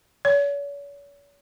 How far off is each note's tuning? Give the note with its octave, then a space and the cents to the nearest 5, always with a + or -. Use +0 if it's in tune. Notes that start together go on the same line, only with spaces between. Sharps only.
C#5 +40